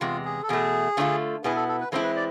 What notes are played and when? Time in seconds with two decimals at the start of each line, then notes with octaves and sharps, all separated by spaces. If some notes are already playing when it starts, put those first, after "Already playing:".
0.01 E2 C3 G#3 F4
0.25 G#4
0.43 A4
0.49 E2 B2 A3 G#4
0.97 D3 A3 D4 F4
1.44 B2 B3 E4 G#4
1.56 A4
1.68 A4
1.80 B4
1.92 E3 G#3 C4 E4 A4
2.04 B4
2.16 D5